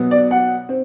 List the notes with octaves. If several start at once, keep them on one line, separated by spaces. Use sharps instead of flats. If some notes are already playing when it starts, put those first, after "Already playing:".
Already playing: B2 F#3 B3
D5
F#5
C4